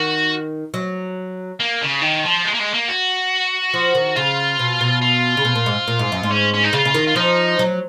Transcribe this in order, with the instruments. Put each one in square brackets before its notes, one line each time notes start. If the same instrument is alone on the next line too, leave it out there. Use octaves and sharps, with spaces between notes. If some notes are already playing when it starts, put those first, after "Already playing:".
Already playing: [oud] D#3 [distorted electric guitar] F#4
[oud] F#3
[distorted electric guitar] A#3
C#3
D#3
F3
G#3
A#3
G#3
A#3
F#4
[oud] F3
D#3
[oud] C#3 [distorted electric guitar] F4
[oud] B2
B2
[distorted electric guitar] F4
[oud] C#3
B2
A#2
G#2
A#2
G#2
F#2
G#2
[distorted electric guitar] C#4
C#4
D#4
[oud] C#3 [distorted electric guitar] F4
[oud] C#3
D#3
[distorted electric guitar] F4
[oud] F3 [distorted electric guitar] D#4
[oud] F#3